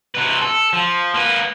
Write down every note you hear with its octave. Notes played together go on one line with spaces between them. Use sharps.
C3 B4
A4
F3
A#3 B4